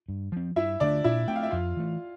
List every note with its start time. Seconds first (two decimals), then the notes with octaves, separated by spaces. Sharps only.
0.08 G2
0.32 F3 C4
0.56 G2 E4 E5
0.80 D3 A3 D4 D5
1.04 A#2 E4 E5
1.28 A3 C4 G5
1.36 F5
1.43 E5
1.51 F2 F4 F5
1.77 E3 A3